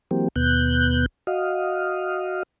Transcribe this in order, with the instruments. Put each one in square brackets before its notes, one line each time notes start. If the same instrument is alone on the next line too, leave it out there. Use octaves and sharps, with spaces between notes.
[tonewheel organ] E3 F#3 A#3 C4 G4
D#2 B2 B3 F#6 G6
F#4 D#5 F5